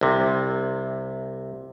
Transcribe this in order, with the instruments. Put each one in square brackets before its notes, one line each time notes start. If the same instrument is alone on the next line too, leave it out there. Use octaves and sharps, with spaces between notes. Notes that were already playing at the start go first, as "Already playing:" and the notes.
[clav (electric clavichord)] C2 C3